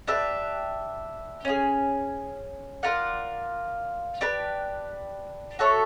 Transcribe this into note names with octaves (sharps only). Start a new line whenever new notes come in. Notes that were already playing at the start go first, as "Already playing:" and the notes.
D4 G4 B4 E5
C#4 F4 G#4
F4 A#4 D5 F#5
D4 G4 B4
F#4 A4 C#5 E5